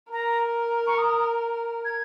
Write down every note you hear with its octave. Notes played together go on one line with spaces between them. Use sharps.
A#4 A#5
C#6
D#6
G#6